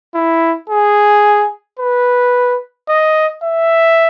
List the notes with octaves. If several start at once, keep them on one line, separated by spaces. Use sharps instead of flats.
E4
G#4
B4
D#5
E5